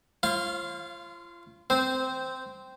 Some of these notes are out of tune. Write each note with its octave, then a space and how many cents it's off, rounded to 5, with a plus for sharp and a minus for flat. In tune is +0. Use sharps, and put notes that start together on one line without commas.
F4 -30 C5 +45 F5 -5
C4 -10 C5 +0